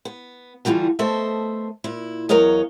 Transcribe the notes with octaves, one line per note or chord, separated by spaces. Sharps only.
B3
D3 E3 G3 F4 F#4
A3 B3 A4 C5 D#5 E5
A#2 E4
E2 F#3 A#4 C#5 D#5 F5